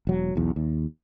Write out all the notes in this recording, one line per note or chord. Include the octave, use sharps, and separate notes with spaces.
E1 F#3
B1 E2
D#2